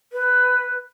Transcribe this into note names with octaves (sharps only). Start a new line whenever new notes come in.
B4